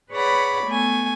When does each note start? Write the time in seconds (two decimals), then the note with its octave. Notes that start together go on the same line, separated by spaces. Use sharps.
0.11 G#4 B4 C#5 D5 F#5 B5
0.65 A3 B3 G#5